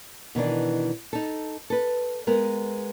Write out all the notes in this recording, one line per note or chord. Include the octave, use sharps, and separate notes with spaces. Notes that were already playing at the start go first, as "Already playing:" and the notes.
B2 D#3 E3 D4
D#4 A4
A4 B4
G#3 B3 A#4